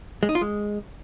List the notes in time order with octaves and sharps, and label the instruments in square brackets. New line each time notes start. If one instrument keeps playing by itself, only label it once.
[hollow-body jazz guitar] G#3
D#4
F4
G#3